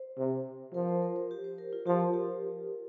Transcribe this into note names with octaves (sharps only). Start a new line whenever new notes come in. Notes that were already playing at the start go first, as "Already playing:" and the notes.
Already playing: C5
C3
F3 A#4
C5
A#4
C5
G4
C5
A#4
F4
F3 G4
A#4
G4